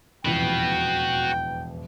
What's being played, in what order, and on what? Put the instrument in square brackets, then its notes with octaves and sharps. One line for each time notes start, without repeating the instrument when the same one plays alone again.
[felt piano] E1 A1 F2 [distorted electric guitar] F#4 B5 [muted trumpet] G5